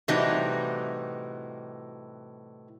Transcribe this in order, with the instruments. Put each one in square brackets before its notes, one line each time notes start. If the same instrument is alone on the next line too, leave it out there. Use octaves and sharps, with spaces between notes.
[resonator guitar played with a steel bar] A2 C3 E3 G3 D#4 F#4